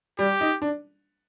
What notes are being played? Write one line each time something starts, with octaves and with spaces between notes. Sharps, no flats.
G3 G4
D#4
D4